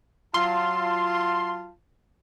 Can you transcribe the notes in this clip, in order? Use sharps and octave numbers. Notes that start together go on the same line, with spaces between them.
F#3 F4 A5 C6